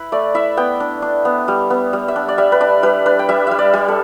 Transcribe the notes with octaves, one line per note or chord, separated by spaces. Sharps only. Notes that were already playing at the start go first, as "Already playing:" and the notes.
Already playing: E4 B4
A3 D5
E4 E5
B3 G5
D4
D4
B3
G3
B3
G3
E5
D4
D5
G3 E5
B4
D4 D5
G3 B4
D4 B4
G5
G3 E5
G3 E5
D5
G3
A4